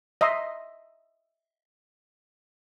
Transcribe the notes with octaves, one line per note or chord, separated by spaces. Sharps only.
D#5 E5 A#5 C6